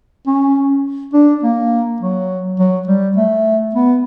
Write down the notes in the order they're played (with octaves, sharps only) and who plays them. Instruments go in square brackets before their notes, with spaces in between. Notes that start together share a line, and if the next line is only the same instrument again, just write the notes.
[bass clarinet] C#4
D4
A#3
F#3
F#3
G3
A3
B3